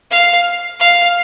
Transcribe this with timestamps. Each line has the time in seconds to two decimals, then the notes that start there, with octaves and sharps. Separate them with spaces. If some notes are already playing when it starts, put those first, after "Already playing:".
0.11 F5
0.80 F5